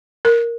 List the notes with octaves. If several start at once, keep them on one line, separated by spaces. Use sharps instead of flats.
A#4